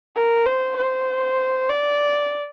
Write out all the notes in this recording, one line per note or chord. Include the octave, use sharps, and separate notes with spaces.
A#4
C5
C5
D5